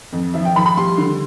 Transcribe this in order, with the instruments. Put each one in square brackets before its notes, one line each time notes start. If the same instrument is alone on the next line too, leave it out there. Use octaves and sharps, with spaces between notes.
[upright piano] F2
F3 E5
G5
F3 B5
B5
G3 C6
D3